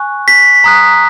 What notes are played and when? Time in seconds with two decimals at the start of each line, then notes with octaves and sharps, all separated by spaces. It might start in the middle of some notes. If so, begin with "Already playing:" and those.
Already playing: G#5 C#6 F#6
0.28 B6
0.64 A#5 D#6 F#6